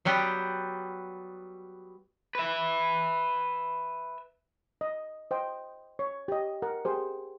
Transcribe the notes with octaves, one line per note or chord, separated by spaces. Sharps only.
F#3 G3 B3 G4
B4 E5
D#5
C5 D#5 G5
C#5
G4 D#5
A#4 F#5
G4 G#4 C5